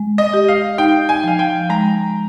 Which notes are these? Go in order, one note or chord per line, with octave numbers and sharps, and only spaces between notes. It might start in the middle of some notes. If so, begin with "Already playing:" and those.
Already playing: G#3
D#5
G4
F5
D#4 G5
G#5
F3 F5
G5
G#3 A#5